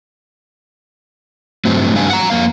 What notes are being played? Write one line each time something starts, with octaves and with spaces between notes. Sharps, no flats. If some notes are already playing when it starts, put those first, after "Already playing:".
G2 F#3 A3 C4
G2 G3 D4 F#4 F5 G#5
F#5 A#5
F2 A#3 F5